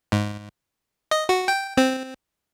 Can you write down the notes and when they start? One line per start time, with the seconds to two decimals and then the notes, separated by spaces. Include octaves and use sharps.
0.12 G#2
1.11 D#5
1.29 F#4
1.48 G5
1.77 C4